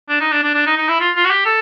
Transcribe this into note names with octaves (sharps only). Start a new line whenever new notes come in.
D4
D#4
D4
D4
D4
D#4
D#4
E4
F4
F4
F#4
G4
A4